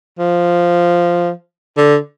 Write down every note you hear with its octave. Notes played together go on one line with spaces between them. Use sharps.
F3
D3